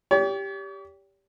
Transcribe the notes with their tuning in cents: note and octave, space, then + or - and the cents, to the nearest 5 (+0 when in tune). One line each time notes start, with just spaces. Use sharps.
G4 +5 C#5 +45